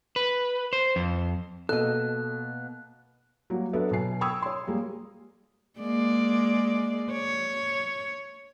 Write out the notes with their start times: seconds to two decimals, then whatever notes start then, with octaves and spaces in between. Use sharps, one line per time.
0.16 B4
0.73 C5
0.96 F2
1.69 B2 A#3 A4 D#5 F#6
3.50 F#3 G3 A#3 F#4
3.73 F#3 B3 D4 A4 D5 E5
3.91 B2 F#3 G#5 C7
4.21 G5 B5 C#6 D#6 E6 G#6
4.42 C#5 C6
4.67 G3 G#3 A#3
5.80 G#3 A#3 D5
7.11 C#5